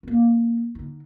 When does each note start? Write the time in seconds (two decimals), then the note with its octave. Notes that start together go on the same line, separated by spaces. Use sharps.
0.03 A#3 C#4
0.75 D3 D#4